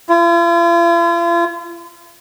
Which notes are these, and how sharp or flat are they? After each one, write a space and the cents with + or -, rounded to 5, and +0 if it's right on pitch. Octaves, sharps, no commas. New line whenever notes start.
F4 -45